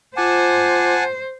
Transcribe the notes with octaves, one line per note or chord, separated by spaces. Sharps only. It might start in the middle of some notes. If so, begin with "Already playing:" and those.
F4 C5 F#5 G#5 A5 D6